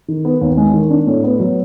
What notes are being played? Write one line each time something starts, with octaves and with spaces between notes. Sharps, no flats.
D#3
B3
D#2
G#3
D#3
D4
A2
B3
F#3